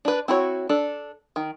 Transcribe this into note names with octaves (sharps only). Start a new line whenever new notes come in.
D4 B4
C4 E4 F#4 B4 C#5
D4 A4
D#3